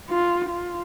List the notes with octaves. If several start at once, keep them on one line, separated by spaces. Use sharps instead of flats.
F4
F4